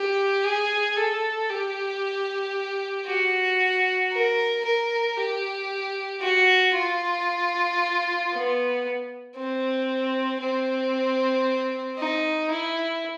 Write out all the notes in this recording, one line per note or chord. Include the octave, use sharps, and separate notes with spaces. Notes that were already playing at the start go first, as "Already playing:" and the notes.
Already playing: G4
G#4
A4
G4
F#4
A#4
A#4
G4
F#4
F4
B3
C4
C4
D#4
E4